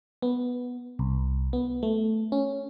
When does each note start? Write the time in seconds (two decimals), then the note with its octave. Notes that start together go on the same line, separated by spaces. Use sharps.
0.22 B3
0.99 C2
1.53 B3
1.83 A3
2.32 C#4